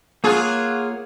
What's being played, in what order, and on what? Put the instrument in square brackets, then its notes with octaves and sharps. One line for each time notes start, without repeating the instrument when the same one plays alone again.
[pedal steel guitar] A#3 C#5 F#5 [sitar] F4 G#4